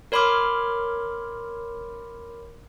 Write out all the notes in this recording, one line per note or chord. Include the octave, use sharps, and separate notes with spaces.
A#4 C#5 B5 C6 D6 F6